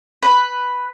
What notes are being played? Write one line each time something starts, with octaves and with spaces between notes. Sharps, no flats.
B4